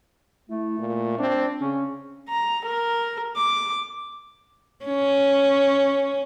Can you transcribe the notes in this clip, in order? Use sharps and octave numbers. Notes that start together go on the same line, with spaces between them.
A3 E4
A#2
C4 D4
C#3 C#4
A#5
A#4
D6
C#4